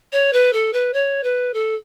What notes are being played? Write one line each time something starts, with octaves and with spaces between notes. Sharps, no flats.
C#5
B4
A4
B4
C#5
B4
A4